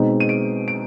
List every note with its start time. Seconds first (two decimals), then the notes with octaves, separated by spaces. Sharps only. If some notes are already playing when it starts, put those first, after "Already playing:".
Already playing: B2 G#3 C4 D#4
0.20 D#7
0.29 D7
0.68 D7